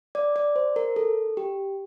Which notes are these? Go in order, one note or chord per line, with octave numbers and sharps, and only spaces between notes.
D5
D5
C5
A#4
A4
G4